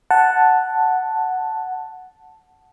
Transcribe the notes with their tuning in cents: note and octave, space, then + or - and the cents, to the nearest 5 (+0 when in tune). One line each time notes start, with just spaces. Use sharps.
F#5 +0 A5 +0